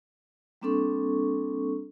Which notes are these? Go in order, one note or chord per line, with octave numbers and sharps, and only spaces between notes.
G3 A#3 C4 D4 A4 C#6